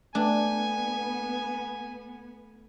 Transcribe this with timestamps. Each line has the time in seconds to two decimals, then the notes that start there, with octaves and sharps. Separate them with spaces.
0.15 A3 B3 D4 G5 G#5